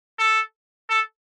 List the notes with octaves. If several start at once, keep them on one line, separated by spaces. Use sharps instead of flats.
A4
A4